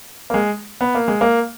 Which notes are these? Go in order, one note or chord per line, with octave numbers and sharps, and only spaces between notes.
A#3
G#3
B3
A#3
G#3
A#3